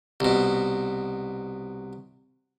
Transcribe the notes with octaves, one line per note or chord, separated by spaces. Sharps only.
C2 B2